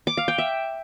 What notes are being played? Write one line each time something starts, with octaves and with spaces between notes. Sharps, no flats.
D6
F5
G5
E5